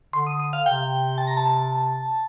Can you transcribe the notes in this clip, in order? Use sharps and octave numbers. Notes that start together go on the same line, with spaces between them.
D3 C6
D#6
D#6
F5
C3 G5
A5
A#5
A5